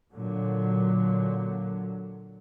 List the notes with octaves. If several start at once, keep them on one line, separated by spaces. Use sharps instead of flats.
A#2 D3 F#3